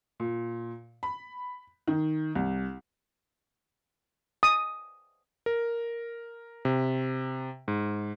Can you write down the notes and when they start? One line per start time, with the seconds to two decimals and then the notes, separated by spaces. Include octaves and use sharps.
0.20 A#2
1.03 B5
1.88 D#3
2.35 C2
4.43 D#6
5.46 A#4
6.65 C3
7.68 G#2